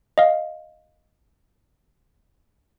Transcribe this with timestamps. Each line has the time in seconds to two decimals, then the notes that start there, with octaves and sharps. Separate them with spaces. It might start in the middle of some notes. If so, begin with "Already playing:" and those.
0.18 D#5 F5